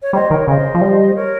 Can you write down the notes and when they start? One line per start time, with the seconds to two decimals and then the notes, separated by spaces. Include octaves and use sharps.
0.01 C#5
0.13 G3 C5 D#5
0.30 D#3 A#4 C#5
0.47 C#3 C5 D#5
0.75 F3
0.81 G3
1.15 A#4 C#5